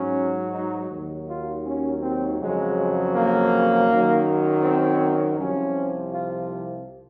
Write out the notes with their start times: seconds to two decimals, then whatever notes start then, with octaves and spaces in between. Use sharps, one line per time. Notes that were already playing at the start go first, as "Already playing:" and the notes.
Already playing: G#2 F#3 C#4
0.53 D#4
0.91 D#2 D#3 F#3
1.29 F4
1.66 C#4
2.03 C4
2.40 F2 C#3 F#3 G#3
3.15 A#3
3.89 F#2 D#3 F#3
4.63 C4
5.38 C2 C3 F3 C#4
6.13 F4